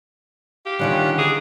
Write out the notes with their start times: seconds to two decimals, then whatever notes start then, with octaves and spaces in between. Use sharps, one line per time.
0.66 G4 F5
0.79 D3 D#3 G3 C#4 F4 F#5
1.19 G#4 A#5 D6